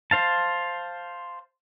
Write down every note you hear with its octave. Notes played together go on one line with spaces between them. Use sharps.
C5 F5 A5